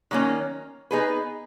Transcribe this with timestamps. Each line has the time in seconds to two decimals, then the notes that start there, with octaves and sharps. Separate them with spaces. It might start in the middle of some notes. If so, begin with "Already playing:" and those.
0.11 D#3 F#3 A#3 C#4
0.91 B3 D#4 G#4 B4